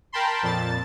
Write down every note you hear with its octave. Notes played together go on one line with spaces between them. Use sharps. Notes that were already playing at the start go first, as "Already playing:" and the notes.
A#4 G5 A5 B5 C6
F2 A#2 A5 A6